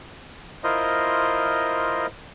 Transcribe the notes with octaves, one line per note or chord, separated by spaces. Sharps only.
E4 F4 A#4 C5 D#5